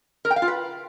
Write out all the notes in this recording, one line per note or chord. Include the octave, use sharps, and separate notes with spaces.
A#4
G5
F5
F4
B4